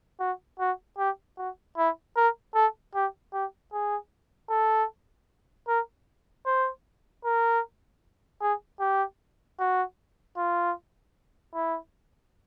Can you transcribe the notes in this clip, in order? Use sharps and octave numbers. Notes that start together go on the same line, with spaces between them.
F#4
F#4
G4
F#4
E4
A#4
A4
G4
G4
G#4
A4
A#4
C5
A#4
G#4
G4
F#4
F4
E4